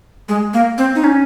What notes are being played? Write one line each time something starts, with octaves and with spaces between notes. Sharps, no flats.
G#3
A#3
C4
D#4
C#4